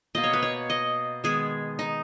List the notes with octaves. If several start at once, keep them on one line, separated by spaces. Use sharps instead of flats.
B2 A#3 D#5
C#5
B4
C#5
D#5
D#3 G#3 B3 G#4
D#4